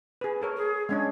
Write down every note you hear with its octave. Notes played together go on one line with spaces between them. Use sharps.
G#4 B4
A4 A#4 C#5
G#4
G#3 C#4 D4 G#6